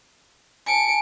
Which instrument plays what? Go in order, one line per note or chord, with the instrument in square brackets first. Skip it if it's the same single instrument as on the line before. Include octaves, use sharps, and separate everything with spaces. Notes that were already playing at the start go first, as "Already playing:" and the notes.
[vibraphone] G#5 A5 [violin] C#7 D7